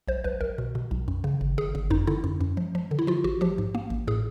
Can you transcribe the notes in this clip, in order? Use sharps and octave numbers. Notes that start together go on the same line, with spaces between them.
B1 C5
B1 B4
B1 A#4
B2
B2
B1
F#2
C#3
G1
G1 G#4
G1
F#2 D#4
D3 E4
F#2
F#2
F3
F3
D3
E4
F3 F4
A1 F#4
F3 G4
G#2
A#3
A1
A2 G#4